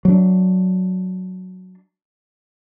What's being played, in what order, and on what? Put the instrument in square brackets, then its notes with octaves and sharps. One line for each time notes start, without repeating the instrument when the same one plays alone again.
[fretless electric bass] F#3 D4